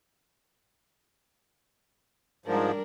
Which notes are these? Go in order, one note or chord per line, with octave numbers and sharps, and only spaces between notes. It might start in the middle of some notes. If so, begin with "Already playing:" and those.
G#2 F3 G3 D4 A#4